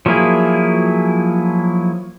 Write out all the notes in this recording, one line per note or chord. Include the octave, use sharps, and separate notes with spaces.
F3 F#3 A#3 E4 G#4